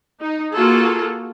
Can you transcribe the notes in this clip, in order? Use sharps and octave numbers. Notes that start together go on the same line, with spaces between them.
D#4
A#3 F4 F#4 G#4 A4